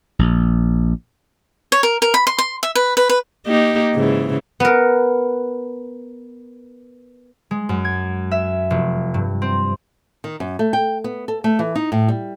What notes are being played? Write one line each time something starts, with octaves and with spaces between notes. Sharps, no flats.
A#1
C#5
A#4
A#4
B5
C6
C6
E5
B4
B4
B4
A#3 D#4 G4
G#2 C#3 E3
B3 A#4
G#3
F#2
G#6
E5
F1
G2
C4
D#3
F#2
A3
G5
B3
A4
A3
E3
D#4
A2
G3